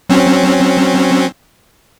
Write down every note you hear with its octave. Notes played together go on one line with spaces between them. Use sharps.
F#3 C4 C#4